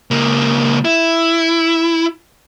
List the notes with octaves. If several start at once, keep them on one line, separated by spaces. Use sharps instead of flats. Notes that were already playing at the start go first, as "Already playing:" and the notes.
C#2 A#3
E4